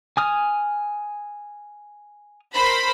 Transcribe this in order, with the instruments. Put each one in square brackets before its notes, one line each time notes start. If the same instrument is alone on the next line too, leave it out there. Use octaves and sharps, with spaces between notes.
[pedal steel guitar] G#5 D#6 F6
[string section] A#4 C5 B5